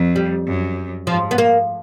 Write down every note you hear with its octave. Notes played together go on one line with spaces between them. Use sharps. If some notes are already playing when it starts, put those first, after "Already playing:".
Already playing: F2
G3
F#2
G#2 F3
B3
A#3